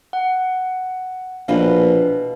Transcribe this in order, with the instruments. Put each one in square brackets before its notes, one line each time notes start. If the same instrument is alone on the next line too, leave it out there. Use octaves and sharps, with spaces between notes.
[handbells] F#5
[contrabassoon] A#1 [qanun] B2 E3 B4 [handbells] F5